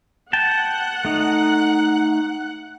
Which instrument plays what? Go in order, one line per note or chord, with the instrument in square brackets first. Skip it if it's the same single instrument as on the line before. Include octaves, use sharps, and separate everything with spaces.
[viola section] F#5 [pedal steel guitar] G5 A5
[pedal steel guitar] A3 D#4